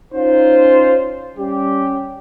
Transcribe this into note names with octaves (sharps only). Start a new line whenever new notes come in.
C#4 D#4 F4 C5
G3 C#4 G4